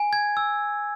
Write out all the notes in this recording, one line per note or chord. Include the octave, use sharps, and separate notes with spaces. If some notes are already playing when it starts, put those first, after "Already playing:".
Already playing: G#5
G#6
E6